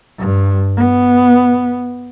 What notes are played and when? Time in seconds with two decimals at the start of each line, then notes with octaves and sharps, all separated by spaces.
0.18 G2
0.77 B3